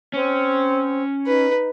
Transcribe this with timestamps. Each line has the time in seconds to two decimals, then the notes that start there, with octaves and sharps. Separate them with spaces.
0.13 C4 C#4
1.26 D#4 B4